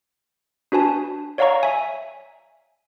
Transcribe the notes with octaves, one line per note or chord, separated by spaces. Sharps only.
D4 F#4 B4 G#5 A5
C#5 D5 F5 F#5 A#5 C#6
E5 G#5